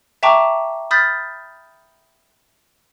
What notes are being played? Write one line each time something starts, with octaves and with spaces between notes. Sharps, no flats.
E5 G5 A5 A#5 C#6 D6
B5 D#6 F6 G6 A6 B6